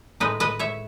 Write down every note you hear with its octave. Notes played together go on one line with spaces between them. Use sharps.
A2 G#3 D#4 B4 D#5
B4 D#5
C#5 E5